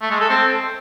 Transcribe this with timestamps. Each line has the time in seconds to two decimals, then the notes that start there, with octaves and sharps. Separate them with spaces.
0.01 A3
0.11 G#3
0.20 A4
0.29 C4